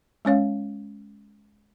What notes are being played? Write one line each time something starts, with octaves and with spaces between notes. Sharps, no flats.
G#3 C#4 C#5 F5